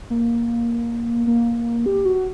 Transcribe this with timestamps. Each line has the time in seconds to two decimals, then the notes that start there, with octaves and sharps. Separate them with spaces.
0.10 A#3
1.27 A#3
1.86 G4
2.05 F#4